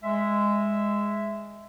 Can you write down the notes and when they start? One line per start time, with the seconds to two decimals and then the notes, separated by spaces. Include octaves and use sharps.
0.01 G#3 E5